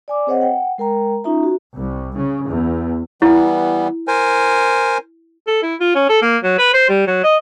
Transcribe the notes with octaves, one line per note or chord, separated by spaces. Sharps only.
D5 G#5 D6
C4 G#4 C5 C#5 D#5 F#5
F#5 G5
G#3 A#4 G5 A#5
C#4 D#4 F4 E5 A#5
F#4
C2
C#3
E2
E3 G3 B3 E4
A#4 C5 G#5
A4
E4
F4
C#4
A4
A#3
F#3
B4
C5
G3
F#3
D#5